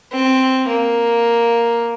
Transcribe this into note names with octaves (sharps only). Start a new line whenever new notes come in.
C4
A#3